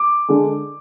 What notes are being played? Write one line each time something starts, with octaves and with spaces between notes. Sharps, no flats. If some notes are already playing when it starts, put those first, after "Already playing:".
Already playing: D6
D3 G#3